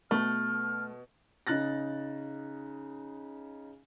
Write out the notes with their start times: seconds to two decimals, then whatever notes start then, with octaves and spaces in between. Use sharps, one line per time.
0.11 B2 A3 F6
1.47 C#3 D#4 F#6 A6 A#6